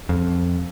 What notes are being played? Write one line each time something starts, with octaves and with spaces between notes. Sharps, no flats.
F2